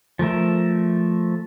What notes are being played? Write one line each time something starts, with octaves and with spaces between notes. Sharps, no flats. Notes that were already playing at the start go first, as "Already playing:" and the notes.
F3 A3 A#4 E5